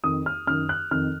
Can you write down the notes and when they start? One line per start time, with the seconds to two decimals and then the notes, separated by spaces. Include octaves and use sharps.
0.03 F2 D#3 D#6
0.26 F6
0.47 F#2 D#3 F6
0.69 F#6
0.91 F2 D#3 F6